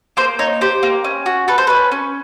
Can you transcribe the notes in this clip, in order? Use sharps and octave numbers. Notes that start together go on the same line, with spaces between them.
A#3 C5
D#4 C#5
G4 C5
A#3
C#4
F#4
A4 B4
C5
C#4 B4
C#4